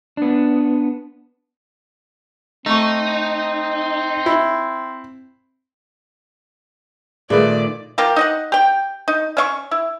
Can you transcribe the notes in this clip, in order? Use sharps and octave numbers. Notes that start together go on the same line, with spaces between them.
B3 D4
A3 C4 D#4 C#6
E4
A#2 D#3 A3 G#4 B4 D5
F3 A#3 G4
D#4 D#5 F#5
G4 G5
D#4
C#4 E5 C#6
E4